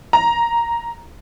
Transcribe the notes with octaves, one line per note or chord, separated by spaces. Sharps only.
A#5